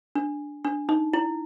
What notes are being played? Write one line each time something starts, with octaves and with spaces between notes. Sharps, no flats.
D4
D4
D#4
E4